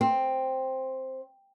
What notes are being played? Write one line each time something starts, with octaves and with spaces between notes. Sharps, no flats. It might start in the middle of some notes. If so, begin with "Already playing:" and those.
C4